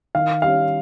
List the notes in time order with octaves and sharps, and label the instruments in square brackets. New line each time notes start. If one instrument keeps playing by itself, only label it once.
[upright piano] D#3 F5
G3 C#4 F5